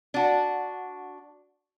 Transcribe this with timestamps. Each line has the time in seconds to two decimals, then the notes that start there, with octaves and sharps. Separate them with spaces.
0.14 D4 F#4